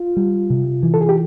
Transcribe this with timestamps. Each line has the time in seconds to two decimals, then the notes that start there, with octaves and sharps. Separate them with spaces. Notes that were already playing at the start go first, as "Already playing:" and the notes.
Already playing: F4
0.16 G3
0.50 C3
0.83 E3
0.94 A4
1.01 G#4
1.09 G4